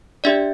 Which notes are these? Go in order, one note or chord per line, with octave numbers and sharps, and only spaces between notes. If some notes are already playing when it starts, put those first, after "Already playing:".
D4 G4 D5 E5